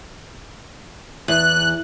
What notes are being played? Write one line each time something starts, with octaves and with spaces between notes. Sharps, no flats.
E2 F#6